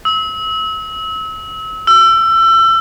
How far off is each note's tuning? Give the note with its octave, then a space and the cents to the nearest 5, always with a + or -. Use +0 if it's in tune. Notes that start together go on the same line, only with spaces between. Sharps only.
E6 -35
E6 +30